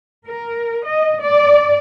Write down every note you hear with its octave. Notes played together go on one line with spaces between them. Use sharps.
A#4
D#5
D5